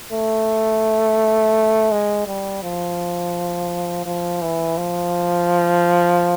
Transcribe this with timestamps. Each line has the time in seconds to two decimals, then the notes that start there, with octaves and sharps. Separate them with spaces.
0.12 A3
1.91 G#3
2.27 G3
2.63 F3
4.06 F3
4.42 E3
4.78 F3